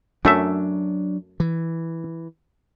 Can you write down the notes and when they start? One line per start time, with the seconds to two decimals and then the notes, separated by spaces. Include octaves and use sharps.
0.25 F#2 F#3 A3 D4 E5
1.40 E3